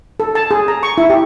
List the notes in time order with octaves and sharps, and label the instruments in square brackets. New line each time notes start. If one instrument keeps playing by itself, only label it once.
[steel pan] A4
A5
G#4
A#5
C#6
E4
G4